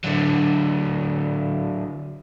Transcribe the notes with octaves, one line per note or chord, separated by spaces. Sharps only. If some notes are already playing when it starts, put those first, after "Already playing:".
D3 F#3